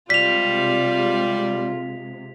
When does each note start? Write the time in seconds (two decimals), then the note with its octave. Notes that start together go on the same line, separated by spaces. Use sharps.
0.10 C3 G3 G#3 F4 B6 F7